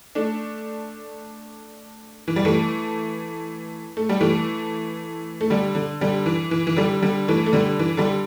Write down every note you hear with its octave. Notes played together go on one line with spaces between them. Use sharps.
A3 D4
E3
G3
E3 A3
A3
G3
E3 A3
A3
D3 G3
D3
D3 G3
E3
E3
E3
D3 G3
D3 G3
E3 A3
A3
D3 G3
E3
D3 G3